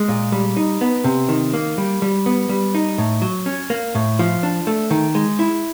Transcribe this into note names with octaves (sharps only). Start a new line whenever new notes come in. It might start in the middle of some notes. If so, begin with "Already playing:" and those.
Already playing: G#3
A#2
G3
D#4
B3
C3
D#3
A#3
G3
G3
B3
G3
D#4
A2
F#3
C#4
A#3
A2
F3
D4
A3
D#3
G#3
E4